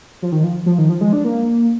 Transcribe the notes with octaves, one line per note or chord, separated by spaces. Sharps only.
F3
D#3
F3
F3
D#3
F3
G#3
D4
A#3